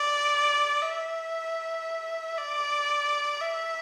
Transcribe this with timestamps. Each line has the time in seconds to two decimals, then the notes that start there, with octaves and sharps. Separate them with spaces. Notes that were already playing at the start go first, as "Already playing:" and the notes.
Already playing: D5
0.82 E5
2.38 D5
3.41 E5